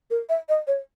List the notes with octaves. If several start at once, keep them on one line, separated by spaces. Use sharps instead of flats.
A#4
E5
D#5
C#5